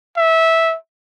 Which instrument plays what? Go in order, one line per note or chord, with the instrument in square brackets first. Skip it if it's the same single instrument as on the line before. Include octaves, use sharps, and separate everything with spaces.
[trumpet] E5